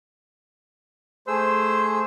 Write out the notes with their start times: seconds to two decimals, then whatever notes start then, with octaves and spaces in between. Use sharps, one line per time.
1.28 A3 G#4 C5 E6